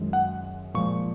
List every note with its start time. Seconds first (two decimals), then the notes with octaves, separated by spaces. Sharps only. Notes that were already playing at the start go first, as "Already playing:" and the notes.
Already playing: F#2 D#3 G#3
0.13 F#5
0.74 A#2 F3 G#3 C#6